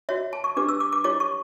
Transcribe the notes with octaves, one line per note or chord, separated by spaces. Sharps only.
F#4 C#5 E5
A5
C#6
D4 G4 B4 D6
E6
D6
D6
E4 G4 C#5 D6
C#6